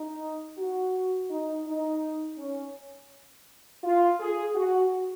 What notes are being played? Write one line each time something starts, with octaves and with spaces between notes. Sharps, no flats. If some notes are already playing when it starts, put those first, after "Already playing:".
Already playing: D#4
F#4
D#4
D#4
C#4
F4
G#4
F#4